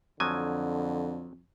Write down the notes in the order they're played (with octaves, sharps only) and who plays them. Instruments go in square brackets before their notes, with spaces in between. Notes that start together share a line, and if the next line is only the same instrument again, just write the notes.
[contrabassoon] F2 [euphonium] D3 [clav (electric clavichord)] F3 F#3 G#5